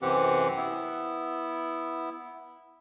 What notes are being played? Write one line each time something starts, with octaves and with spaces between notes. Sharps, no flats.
F#2 C3 E3 C4 G4 F#5
B3 E4